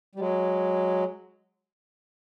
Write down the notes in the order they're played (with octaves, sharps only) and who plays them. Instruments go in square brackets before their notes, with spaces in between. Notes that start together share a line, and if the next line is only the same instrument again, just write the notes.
[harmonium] G3
F#3 G#3